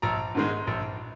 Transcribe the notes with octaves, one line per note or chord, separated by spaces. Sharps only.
A#1 A#5
G#2 D#3 G#3
A#1